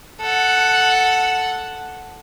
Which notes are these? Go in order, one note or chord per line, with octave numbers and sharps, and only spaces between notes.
A4 F#5